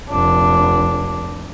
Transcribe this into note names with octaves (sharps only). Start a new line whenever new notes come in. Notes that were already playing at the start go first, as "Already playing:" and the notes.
F1 D4